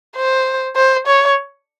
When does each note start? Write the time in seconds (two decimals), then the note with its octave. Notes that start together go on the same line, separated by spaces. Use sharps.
0.17 C5
0.76 C5
1.07 C#5